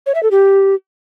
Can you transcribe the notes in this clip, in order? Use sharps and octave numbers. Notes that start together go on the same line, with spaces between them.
C#5
E5
A4
G4